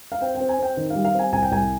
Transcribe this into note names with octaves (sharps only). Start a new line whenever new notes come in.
F5
C4 G5
G5
C4
G#5
C4 G5
D#3
F5
G3
F5
C4
G#5
C2 G#5
G5
C2 G#5